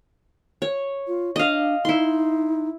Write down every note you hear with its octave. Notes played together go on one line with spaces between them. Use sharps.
C#5
F4
D4 D#5 F5
D#4 E4 C6